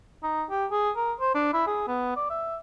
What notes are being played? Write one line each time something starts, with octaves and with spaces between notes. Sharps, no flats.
D#4
G4
G#4
A#4
C5
D4
E4
G#4
B3
D5
E5